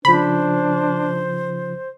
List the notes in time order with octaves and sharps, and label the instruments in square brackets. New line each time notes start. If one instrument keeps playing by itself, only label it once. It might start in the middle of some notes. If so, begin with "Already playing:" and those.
[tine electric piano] C#3 F3 [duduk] D4 [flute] C5 [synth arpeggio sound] B5